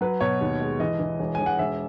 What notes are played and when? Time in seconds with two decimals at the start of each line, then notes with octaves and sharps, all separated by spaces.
0.01 F#3 B4
0.21 B2 C#5
0.41 D#2
0.61 G#3
0.80 E3 D#5
1.00 E3
1.19 E1
1.35 E1 G#5
1.46 F#5
1.59 E1 E5